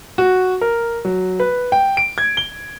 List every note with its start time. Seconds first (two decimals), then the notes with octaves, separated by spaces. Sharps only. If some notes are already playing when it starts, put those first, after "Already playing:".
0.18 F#4
0.61 A#4
1.05 F#3
1.40 B4
1.72 G5
1.97 D7
2.18 G#6
2.37 G7